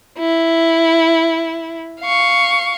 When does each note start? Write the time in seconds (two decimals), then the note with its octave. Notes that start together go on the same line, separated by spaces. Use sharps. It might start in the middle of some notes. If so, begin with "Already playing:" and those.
0.19 E4
2.01 F5 C#6